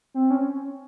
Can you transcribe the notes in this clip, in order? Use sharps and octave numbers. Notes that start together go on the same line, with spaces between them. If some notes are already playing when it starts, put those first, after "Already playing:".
C4
C#4